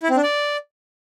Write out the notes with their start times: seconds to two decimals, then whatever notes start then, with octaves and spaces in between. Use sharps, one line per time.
0.03 E4
0.10 C4
0.16 D4
0.23 D5